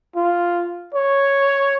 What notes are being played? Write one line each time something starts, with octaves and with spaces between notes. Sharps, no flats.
F4
C#5